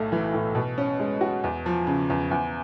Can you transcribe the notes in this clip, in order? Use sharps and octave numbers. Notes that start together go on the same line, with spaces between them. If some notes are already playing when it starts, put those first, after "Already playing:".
Already playing: B1 A2 A3
E3
A2
B2
C#4
G#3
F#4
E2
F3
C#3
E2
E2